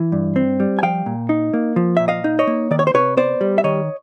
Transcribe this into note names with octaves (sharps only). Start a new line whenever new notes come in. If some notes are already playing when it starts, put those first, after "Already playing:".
Already playing: E3
G2
C4
G3
G#5
F3 F5 G5
A#2
D#4
A#3
F3
A#2 E5
D#5 F5
D#4
C#5 D#5
A#3
D#3 D5
C#5
C5
C3 B4 C#5
B3 C5 D5
G3
E5
D#3 C#5 D#5